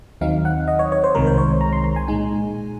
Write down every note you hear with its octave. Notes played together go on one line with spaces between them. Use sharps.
D#2 D#3 F#3 C4 D#4 F5
F#5
D#5
C#5
C#5
C5
C2 C3 D#3 G#3 A#4
C5
C#5
A#5
C6
A#5
G#5
A#2 G#3 D#4 G#5